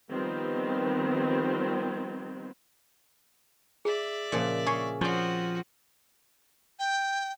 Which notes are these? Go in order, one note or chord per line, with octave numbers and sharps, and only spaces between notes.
D#3 F3 G3 B3 C4
G#4 D5 E5
A#2 C#3 F3
G#4 C#5 F5 C#6
F3 C4 C#4 F#4 D5
G5